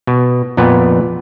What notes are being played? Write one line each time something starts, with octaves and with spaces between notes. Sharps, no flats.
B2
F2 A#2 B3 B4